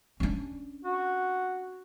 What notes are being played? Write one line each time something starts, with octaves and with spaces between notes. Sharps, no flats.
C#4 D4
F#4